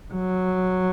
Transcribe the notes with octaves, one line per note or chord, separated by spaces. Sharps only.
F#3